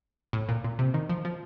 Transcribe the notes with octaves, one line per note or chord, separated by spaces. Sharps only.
A2
A#2
A#2
C3
D#3
F3
F3